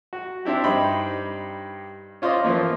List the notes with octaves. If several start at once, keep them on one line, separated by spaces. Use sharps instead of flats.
F#4
C4 D4 E4 G4
G2 D#4 C5 G5 B5
C#4 F4 C5 D5 D#5
E3 F3 A#3 C#4